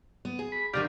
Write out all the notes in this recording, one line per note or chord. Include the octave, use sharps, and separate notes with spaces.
B3
G#4
B5
D2 D3 D#3 G4 D5 F5